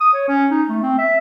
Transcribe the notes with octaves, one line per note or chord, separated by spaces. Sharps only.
D#6
C#5
C#4
D#4
A3
C4
E5